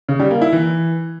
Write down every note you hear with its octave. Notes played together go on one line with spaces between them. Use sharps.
C#3
G3
A#3
E4
E3